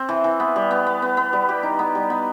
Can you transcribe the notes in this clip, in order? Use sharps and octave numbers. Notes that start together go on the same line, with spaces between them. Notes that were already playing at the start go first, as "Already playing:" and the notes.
Already playing: C4
E3
E3
B3
G3
B3
B3
B3
B3
G3
G4
D#4
B3
G3
B3